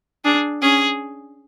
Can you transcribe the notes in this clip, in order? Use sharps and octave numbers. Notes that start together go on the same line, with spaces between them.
D4 G#4
C#4 G#4